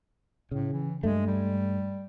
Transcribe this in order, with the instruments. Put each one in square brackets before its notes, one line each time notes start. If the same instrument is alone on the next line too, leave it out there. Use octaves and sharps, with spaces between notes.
[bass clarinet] A2 [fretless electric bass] C#3
[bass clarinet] E3
[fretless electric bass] G2 A3 [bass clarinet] G#3
[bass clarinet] G3